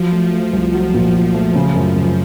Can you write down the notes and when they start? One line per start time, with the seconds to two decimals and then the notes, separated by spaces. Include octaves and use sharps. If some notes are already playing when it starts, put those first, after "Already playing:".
Already playing: F3 F#3
0.12 A3
0.32 F3 A3
0.53 C2
0.73 F3 F#3
0.94 A#2
1.15 F#3
1.34 A3
1.55 C#3 F3
1.75 F#2
1.96 C#3